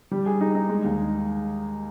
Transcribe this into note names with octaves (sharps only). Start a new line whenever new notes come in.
G3
G#4
D#4
D#4
G#3
D#2